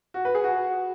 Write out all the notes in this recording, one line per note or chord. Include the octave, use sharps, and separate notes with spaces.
F#4
B4
G#4
F#4